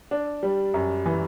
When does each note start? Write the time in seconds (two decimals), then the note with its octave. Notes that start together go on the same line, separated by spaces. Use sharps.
0.11 D4
0.43 G3
0.74 F#2
1.06 E3